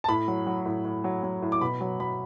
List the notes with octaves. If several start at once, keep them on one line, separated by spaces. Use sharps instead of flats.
A5
A2 B5
F#3
F#3
A2
A2
F#3
F#3
A2
D6
B2 B5
F#3
F#3 B5